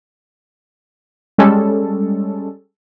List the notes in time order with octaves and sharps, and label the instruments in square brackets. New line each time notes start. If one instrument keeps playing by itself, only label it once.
[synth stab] G3 G#3 C#4 A4